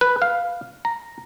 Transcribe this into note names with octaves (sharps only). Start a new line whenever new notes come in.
B4
F5
A#5